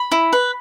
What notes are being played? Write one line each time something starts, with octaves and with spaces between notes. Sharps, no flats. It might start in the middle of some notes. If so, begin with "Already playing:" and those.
Already playing: B5
E4
B4